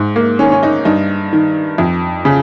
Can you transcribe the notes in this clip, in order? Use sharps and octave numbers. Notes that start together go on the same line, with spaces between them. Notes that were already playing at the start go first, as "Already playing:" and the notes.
Already playing: G#2
A#3
D#3 C#4
C#4
D#4
G2 D#4
D#3
F2
C#3